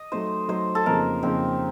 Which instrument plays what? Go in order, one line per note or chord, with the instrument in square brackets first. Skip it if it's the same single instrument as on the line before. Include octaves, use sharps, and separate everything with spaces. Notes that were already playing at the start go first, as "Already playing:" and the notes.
Already playing: [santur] D#5
[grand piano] F#3 A3 D#4 [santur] C5
[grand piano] F#3 A3 D#4 [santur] C5
[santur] A4
[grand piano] F2 C#3 F3 A#3 D#4 [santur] A#4
[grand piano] F2 C#3 F3 A#3 D#4 [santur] C4